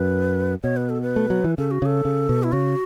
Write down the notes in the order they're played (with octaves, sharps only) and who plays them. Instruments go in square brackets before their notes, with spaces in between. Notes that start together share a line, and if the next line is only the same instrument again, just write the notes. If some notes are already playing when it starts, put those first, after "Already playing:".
Already playing: [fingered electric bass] F#2 [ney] B4
[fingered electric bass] B2 [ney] C#5
[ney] B4
A4
B4
[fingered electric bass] A3
F#3
E3
[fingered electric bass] C#3 [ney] A4
[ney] F#4
[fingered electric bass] C#3 [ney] A4
[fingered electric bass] C#3
B2
[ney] E4
[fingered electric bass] C#3 [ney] F#4